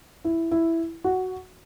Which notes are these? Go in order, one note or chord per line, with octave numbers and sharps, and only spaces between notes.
E4
E4
F#4